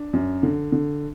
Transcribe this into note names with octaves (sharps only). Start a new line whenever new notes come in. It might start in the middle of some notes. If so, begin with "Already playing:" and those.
Already playing: D4
F#2
D3
D3